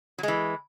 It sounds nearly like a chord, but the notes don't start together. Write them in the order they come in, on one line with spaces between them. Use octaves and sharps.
F#3 G#3 E3